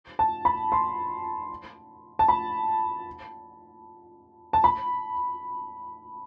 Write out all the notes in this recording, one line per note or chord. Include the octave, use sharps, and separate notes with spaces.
A5
B5
C6
A5
B5
A5
B5